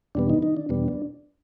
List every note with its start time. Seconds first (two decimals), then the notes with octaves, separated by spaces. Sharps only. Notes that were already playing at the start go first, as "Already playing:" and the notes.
0.15 E2 B2 G3 B3 D4
0.30 D#3 D#4
0.42 D#3 D#4
0.57 D4
0.69 E2 B2 G3 B3 D4
0.88 D4